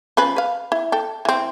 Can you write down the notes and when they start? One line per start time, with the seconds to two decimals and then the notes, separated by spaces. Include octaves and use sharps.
0.17 F3 C#4 B4
0.36 B4 F5
0.72 E4
0.92 A4 G5
1.25 E3 C4